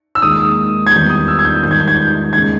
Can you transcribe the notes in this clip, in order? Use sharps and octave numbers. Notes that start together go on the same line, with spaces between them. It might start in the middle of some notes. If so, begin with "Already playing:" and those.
E6
D#2 D#3 G#3 D#6
G#6
E2 D#3 G3 G6
D#6
E6
G#6
G6
G#2 D#3 G3 G6
G#6
G6
G#6
G6
D#2 C#3 G#3 G#6